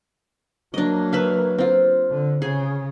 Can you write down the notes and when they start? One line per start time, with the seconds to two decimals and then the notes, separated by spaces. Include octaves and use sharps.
0.74 F#3 A#3 D4 D#5
1.13 B4 E5 F5
1.58 C4 F4
2.10 D3
2.42 C#3 G#4